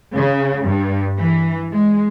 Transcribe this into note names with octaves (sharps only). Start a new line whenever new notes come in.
C#3
G2
E3
G#3